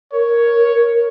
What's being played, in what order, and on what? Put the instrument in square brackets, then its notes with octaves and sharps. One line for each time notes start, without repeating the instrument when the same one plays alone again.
[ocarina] A#4 [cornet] C#5